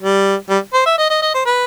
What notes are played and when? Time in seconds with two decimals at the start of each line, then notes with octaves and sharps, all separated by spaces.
0.02 G3
0.49 G3
0.74 C5
0.86 E5
0.98 D#5
1.10 D#5
1.22 D#5
1.34 C5
1.46 B4